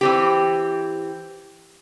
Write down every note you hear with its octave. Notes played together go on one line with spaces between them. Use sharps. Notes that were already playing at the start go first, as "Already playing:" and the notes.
E3 C4 G4